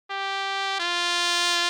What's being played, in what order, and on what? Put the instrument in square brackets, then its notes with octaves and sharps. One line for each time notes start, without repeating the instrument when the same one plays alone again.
[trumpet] G4
F4